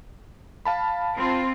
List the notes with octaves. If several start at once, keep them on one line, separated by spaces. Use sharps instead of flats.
F5 A5 B5
C4 F4